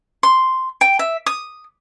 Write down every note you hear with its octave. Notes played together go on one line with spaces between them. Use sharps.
C6
G5
E5
D#6